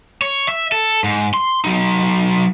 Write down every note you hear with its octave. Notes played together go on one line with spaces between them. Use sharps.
C#5
E5
A4
G#2
C6
F#3 D#4